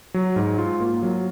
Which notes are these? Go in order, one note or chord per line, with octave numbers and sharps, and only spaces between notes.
F#3
G#2
F4
A#3
F#3